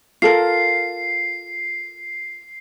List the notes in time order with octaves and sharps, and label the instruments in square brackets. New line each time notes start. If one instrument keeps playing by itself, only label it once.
[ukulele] F4 A4 A#4 [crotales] C7